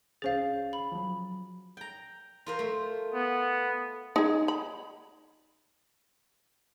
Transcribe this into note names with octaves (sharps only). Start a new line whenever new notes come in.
C2 C#4 G#4 C5 F5 A6
B5
F3 F#3
G5 A#5
F4 A#4 C5
A3
B3
D#4 G#4
B5